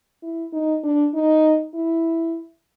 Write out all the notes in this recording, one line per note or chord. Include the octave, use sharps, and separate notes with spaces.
E4
D#4
D4
D#4
E4